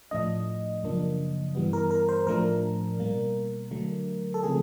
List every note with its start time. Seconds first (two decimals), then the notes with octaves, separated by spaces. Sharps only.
0.11 A2 F3 A3 D4 D#5
0.83 F#2 C#3 F3 A#3 D4
1.55 G2 E3 G3 B3
1.73 A#4
1.91 A#4
2.09 C5
2.27 A2 F3 A3 D4 A#4
2.99 B2 G3 A#3
3.71 D3 F#3 A3
4.34 A4
4.43 C#3 F3 A3 C4 G#4